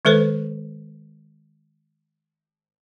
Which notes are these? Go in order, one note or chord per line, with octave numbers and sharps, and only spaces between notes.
D#3 G#3 A4 B4 C5